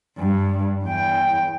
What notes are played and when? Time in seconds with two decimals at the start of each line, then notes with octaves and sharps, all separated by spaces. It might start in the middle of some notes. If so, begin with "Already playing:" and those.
0.18 G2
0.84 E2 G5